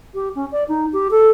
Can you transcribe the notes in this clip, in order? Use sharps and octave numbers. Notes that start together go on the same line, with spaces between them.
G4
C#4
D5
D#4
G4
A4